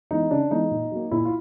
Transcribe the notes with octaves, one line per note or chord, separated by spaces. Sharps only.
E3 G#3 B3 D#4
C#3 D4
E3 G#3 B3 D#4
A#2
F#3 A#3
A#2 E4
F4